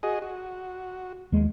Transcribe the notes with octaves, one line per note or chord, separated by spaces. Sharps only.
F#4 G#4 D#5
F#4
D#2 G#3